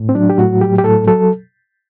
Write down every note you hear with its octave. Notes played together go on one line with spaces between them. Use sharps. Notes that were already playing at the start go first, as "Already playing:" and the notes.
Already playing: A2
C4
F#3 D4
G4
A2 F#4
F#3 G4
G4
A2 A4
F#3 A4